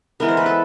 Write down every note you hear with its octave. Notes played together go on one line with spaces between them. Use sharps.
E3 G#3 B3 A#4
C5
B4
A4